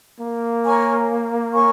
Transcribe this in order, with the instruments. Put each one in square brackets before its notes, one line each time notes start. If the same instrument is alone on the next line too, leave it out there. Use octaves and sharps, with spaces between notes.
[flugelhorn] A#3
[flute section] A#4 C#5 G#5 C#6
A#4 C#5 G#5 C#6